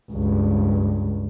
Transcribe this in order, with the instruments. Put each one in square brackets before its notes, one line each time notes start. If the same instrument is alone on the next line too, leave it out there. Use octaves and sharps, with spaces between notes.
[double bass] C#2 G2